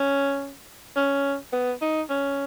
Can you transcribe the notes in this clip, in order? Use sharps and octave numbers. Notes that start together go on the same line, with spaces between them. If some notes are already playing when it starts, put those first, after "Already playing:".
Already playing: C#4
C#4
B3
D#4
C#4